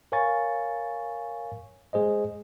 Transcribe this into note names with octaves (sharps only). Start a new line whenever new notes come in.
A#4 C#5 F5 G#5 C#6 A6
G#3 G#4 C5 D#5